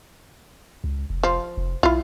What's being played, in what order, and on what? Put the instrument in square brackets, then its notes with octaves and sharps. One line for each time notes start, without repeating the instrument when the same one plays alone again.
[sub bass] C#2
F1
[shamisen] F3
[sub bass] F1
[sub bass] B1 [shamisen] E4 F4